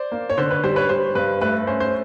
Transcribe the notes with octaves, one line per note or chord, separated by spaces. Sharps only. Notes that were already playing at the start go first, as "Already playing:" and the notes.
Already playing: C5 D5
A#3
C#5
D3 C5
B4
G3 C5
B4 C#5
G3 C5
G2 B4
A3 B4
C#4 C5
C5